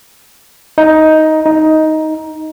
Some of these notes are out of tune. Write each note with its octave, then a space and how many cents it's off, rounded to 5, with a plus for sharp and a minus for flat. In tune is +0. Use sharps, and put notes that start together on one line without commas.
D#4 +10
D#4 +10